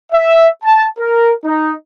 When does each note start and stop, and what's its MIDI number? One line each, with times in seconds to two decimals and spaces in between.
0.13 0.47 76
0.64 0.86 81
0.99 1.32 70
1.45 1.73 63